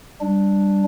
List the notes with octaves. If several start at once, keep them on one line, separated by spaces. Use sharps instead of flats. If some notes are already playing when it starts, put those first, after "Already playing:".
G3 D4